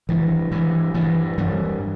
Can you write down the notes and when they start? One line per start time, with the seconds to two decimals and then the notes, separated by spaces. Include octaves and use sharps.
0.09 G2 E3
0.52 G2 E3
0.94 G2 E3
1.38 G2 E3 G3